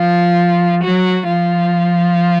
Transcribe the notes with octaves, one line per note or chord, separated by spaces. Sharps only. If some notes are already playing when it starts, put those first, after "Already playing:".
Already playing: F3 F4
F#3 F#4
F3 F4